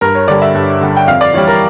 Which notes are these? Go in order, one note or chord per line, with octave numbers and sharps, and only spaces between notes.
G2 A#4
C#5
D3 G3 D5
E5
G2
D3 G3
G5
F2 F5
D5
E3 G3 C#5
A#4